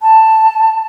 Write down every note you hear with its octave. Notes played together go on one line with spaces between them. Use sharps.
A5